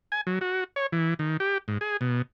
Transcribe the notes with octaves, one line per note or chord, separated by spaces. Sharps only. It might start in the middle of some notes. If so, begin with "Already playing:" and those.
G#5
F#3
F#4
C#5
E3
D#3
G4
G#2
G#4
B2